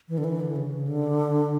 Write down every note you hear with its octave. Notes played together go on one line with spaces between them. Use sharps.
E3
D3
E3
D3
C#3
D3